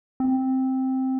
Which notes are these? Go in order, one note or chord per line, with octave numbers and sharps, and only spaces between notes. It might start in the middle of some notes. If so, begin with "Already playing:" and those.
C4